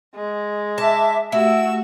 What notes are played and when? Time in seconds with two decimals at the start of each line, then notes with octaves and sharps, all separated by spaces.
0.15 G#3
0.78 E5 A5 D6
1.32 A3 E4 F#4 G4 E6